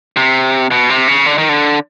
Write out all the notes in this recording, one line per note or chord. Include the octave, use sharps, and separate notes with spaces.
C3
B2
C3
C#3
D3
D#3
D3